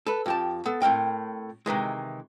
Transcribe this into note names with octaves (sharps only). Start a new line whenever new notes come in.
A4 B4
F2 G4 A5
B3 A4
A2 C4 A#4 G5
C3 D#3 E3 G#3